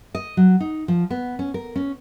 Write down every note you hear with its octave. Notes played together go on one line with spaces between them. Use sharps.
D#5
F#3
D#4
F3
B3
C#4
A#4
C#4